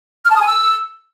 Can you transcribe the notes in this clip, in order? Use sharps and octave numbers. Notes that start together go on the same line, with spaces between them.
F6
A5
D#6
G#5
E6